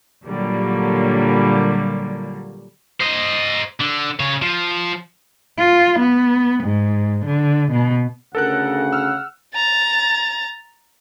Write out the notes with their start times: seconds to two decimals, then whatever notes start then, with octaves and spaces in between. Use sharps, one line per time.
0.26 A#2 D3 F#3 G3 A#3
3.01 C5 D#5
3.80 D3
4.20 C#3 C#5
4.42 F3
5.58 F4
5.99 B3
6.64 G#2
7.26 D3
7.71 B2
8.35 D2 C#3 A4 A#4 F#5 F#6
8.93 E6 F6
9.55 A#5 A6